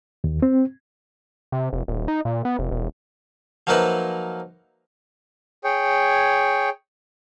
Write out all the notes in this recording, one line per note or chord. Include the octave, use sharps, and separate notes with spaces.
D#2
C4
C3
F1
D#1
D#4
A#2
B3
F1
E1
F3 F#3 A#3 D#4 B4 E5
G#4 C#5 G5